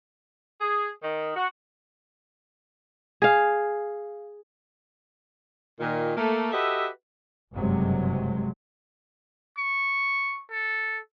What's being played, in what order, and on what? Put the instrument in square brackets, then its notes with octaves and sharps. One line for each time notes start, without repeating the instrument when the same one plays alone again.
[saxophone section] G#4
D#3
F#4
[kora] G#4 F5
[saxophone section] A#2 D#3
A3 A#3
F#4 G4 A4 B4 D#5 E5
[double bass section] F#1 G2 C3 F#3 G#3
[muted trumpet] C#6
A4